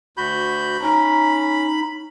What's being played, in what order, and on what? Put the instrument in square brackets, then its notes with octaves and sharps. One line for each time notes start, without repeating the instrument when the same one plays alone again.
[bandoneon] D2 F#4 G6 [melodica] B5
[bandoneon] C#4 [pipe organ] D#4 [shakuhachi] A#5